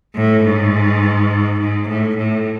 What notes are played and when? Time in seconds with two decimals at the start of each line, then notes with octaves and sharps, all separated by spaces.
0.16 A2
0.44 G#2
1.60 G#2
1.88 A2
2.17 A2